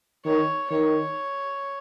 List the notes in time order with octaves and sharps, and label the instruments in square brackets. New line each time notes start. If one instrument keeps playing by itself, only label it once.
[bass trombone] D#3 [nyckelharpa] C#5
[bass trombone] D#3 [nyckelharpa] C#5